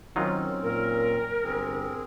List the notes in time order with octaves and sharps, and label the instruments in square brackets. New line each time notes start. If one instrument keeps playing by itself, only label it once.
[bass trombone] D#3 [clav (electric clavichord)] F#3 D#4 F4 [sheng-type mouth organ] C4 C#4
[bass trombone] A#2 [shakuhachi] A#4
[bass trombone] G1 [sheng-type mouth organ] C4 G#4